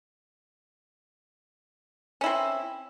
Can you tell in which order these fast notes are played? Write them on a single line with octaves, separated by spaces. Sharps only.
C#4 E4 C4